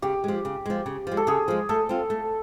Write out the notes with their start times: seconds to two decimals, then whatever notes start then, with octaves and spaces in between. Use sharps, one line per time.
0.02 C#3 G4
0.24 F3 G#3
0.45 C#3
0.66 F3 G#3
0.86 C#3
1.07 F3 G#3
1.17 A4
1.27 C#3 G#4
1.48 F3 G#3
1.69 A3 A4
1.89 C4 F4
2.10 A3